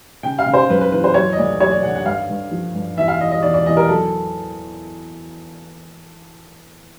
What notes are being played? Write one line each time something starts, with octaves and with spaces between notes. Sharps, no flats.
C#3 G5
F5
C#3
C5
F#2 B4
B4
E3 B4
C5
F#3 C#5
D#5
D2 D5
F#3 C#5
D5
D3 F#5
F#5
G2 F5
G2
F3
G2
E2 E5
F5
E2 D#5
D#5
E2 D5
D5
E2 D#5
A#4
F#3 A4